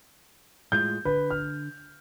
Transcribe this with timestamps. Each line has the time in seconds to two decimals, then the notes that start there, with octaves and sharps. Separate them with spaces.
0.72 A2 G#3 F4 G6
1.05 D3 B4
1.30 F6